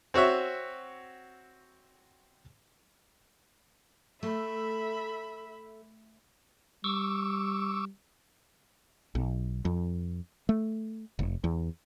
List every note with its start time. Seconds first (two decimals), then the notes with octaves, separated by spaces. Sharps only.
0.14 C4 F#4 C#5 E5
4.23 A3 A4 E5 B5
6.84 G3 C#6 D6 E6
9.15 B1
9.65 F2
10.49 A3
11.19 F1
11.44 E2